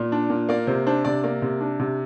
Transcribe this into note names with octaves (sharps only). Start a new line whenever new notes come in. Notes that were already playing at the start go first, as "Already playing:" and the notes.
Already playing: A#2
D4
A#2
A#3 D5
C3 C5
D4 C5
C3 D5
A#3 D5
C3
D4
C3